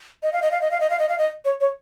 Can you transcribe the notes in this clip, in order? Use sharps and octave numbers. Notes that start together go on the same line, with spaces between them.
D#5
F5
D#5
F5
D#5
F5
D#5
F5
D#5
F5
D#5
C#5
C#5